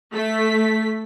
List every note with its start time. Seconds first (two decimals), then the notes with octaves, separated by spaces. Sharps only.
0.12 A3 B6